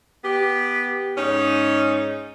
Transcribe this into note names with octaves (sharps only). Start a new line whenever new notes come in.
B3 G4
G#2 C#4 D#4